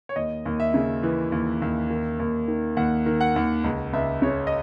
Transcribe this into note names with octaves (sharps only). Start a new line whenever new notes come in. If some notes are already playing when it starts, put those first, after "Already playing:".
C#5
D#2 D#5
D#2
E5
C#3
E3
D#2
D#2
D#3
D#2
D#3
D#2 F#5
D#3
F#5
D#2
C#2
C#2 E5
C#3 C#5
D#5